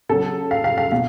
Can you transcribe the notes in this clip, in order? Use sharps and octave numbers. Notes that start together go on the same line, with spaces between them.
C#3 F#3 A4
F5
F5
F5
B2 F5